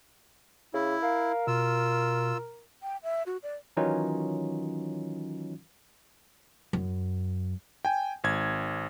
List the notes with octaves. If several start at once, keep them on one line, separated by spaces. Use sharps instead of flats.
C#3 E4
A#4 F5
B2 F4 E6
G5
E5
F#4
D5
D#3 E3 F#3 C#4 D#4 F4
F#2
G5 G#5
G#1 G#6